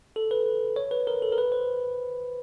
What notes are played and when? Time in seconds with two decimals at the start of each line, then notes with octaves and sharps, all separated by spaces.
0.16 A4
0.31 B4
0.76 C#5
0.91 B4
1.07 A#4
1.22 A4
1.32 A#4
1.38 B4
1.52 C5